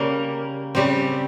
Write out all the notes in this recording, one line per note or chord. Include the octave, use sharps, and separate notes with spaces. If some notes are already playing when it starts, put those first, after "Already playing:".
Already playing: C#3 G3 A#3
C#3 G3 C4